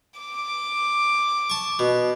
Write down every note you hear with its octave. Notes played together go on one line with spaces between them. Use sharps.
D6
A5 C#6
B2